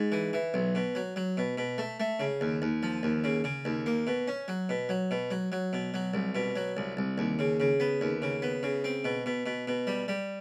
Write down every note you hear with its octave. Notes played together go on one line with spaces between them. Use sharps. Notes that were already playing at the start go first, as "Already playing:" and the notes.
Already playing: G#2
E3
E3
B1
B2
F#3
F#3
B2
B2
A3
A3
C#3
D#2
D#2
F3
D#2
C#3
C#3
D#2
A#3
B2
C#4
F#3
B2
F#3
B2
F#3
F#3
B2
F#3
C2
B2
F#3
C2
C2
D#2
C#3
C#3
B3
D#2
C#3
B3
C#3
C4
B2
B2
B2
B2
G3
G3